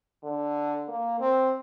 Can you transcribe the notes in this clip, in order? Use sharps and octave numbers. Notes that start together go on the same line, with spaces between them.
D3
A#3
C4